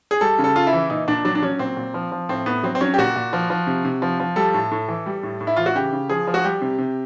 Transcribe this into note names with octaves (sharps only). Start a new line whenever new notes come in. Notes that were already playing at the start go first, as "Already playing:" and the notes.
G#4
G3 A4
C#3
A4
C#3 F4
E4
E3
A#2 D#4
A#2 D4
F#3 D4
D4
F#3 C#4
A#2 C4
A#2
F3
F3
A2 C4
A2 B3
F#3 C4
C4
F#3 C#4
G4
A#2 F#4
A#2
F3
F3
C3
C3
F3
F3
G3 A4
A2
A2
E3
G3
A2
A2
E4
E3 F4
F#4
C#3 G4
C#3
F3 G#4
F3
F#4
G3 G4
C3
C3